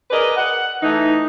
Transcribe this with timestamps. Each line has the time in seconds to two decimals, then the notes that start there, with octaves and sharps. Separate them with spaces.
0.11 G#4 A#4 B4 D5 D#5
0.36 F#5
0.82 E3 A3 D#4